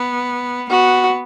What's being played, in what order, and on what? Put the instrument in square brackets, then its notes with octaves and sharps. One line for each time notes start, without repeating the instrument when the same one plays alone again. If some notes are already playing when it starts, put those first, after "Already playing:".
Already playing: [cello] B3
[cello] B3 [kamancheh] F#4